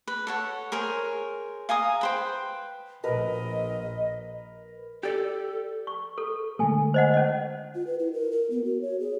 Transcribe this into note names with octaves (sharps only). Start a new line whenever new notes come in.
B4
A4 C#5 F#5
G#4 A#4 C5 C#5
F5 G#5 A#5 D#6
B4 C5 G5
A#1 A#2 A#4 B4 D#5
G4 A4 D5
C#6
A4
D3 G#3 A3 A4 G#5
C5 D#5 F#5
C#4 D#5
F4
B4
E4
A#4
A#4
B3
F#4
C#5
G#4